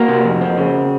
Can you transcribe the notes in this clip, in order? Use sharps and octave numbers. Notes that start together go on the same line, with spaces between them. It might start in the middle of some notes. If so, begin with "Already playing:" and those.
Already playing: A#3 F#4 A#4
C3
F2
C4
C#3